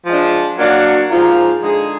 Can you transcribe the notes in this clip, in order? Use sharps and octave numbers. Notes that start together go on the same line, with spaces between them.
F3 G#3 D4
F#3 A#3 D4 F#4
G#2 F3 A#3 F4
D3 G#3 D#4 G#4